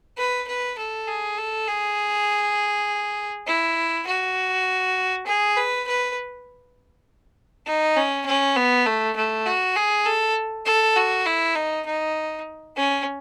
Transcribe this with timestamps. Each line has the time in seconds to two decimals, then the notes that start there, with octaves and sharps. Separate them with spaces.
0.18 B4
0.48 B4
0.78 A4
1.08 G#4
1.38 A4
1.68 G#4
3.47 E4
4.07 F#4
5.27 G#4
5.57 B4
5.87 B4
7.67 D#4
7.96 C#4
8.26 C#4
8.56 B3
8.86 A3
9.16 A3
9.46 F#4
9.76 G#4
10.06 A4
10.66 A4
10.96 F#4
11.26 E4
11.55 D#4
11.86 D#4
12.76 C#4